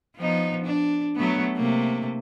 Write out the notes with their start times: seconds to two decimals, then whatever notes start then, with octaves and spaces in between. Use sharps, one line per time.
0.17 F3 B3 D#4
0.64 D4
1.16 F#3 A3 B3
1.56 C3 A3 A#3